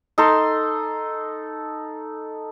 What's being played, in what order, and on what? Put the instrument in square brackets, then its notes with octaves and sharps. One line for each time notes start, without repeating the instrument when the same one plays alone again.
[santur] D#4 A4 C6